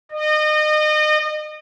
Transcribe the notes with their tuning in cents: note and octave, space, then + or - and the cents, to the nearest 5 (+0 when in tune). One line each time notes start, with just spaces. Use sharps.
D#5 -35